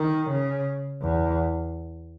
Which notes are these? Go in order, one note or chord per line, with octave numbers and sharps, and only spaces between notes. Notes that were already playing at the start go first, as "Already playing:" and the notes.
Already playing: D#3
C#3
E2